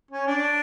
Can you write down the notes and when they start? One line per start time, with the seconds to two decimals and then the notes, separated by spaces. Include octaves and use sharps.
0.11 C#4
0.27 D4